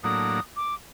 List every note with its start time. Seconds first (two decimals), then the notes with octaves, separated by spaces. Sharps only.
0.03 A2 F#3 A#3 D4 D#6
0.56 D6